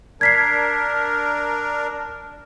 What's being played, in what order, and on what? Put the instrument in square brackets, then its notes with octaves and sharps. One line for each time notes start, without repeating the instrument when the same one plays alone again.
[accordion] D4 A#4 [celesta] G#6 B6 C7